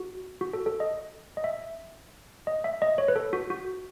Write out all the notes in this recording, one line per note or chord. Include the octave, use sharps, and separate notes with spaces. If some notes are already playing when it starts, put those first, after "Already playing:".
Already playing: F#4
F#4
A4
A4
D#5
D#5
E5
D#5
E5
D#5
C#5
B4
A4
F#4
F#4